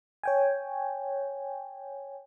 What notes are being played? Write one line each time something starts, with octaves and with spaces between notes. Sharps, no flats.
C#5 G5 G#5